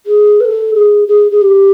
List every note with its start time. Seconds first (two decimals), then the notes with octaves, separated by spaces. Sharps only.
0.06 G#4
0.40 B4
0.45 A4
0.74 G#4
1.08 G#4
1.31 G#4
1.41 G4